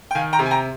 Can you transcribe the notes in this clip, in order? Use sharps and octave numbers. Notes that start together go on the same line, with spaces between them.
G5
D#3 F5 G#5
G5 A#5
C3
G#5
G5 A#5